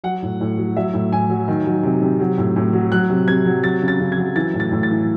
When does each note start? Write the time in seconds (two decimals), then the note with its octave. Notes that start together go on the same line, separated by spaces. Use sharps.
0.04 F#3 F#5
0.22 A2
0.41 A2
0.57 F#3
0.76 F#3 E5
0.94 A2
1.12 A2 G#5
1.30 F#3
1.48 D#3
1.66 F#3
1.83 C3
2.02 C3
2.20 F#3
2.38 A2
2.56 A2
2.73 F#3
2.92 F#3 F#6
3.10 C3
3.28 C3 G#6
3.46 F#3
3.64 F#3 A6
3.82 C#3
3.88 A6
4.00 C#3
4.12 G#6
4.17 F#3
4.36 E3 A6
4.54 A2
4.60 A6
4.72 A2
4.83 A6
4.90 E3